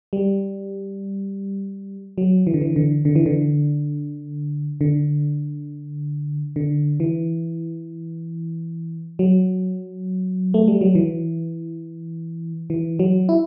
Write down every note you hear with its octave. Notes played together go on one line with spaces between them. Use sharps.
G3
F#3
E3
D3
E3
D3
D3
E3
D3
D3
D3
E3
F#3
A3
G3
F#3
E3
E3
F#3
E4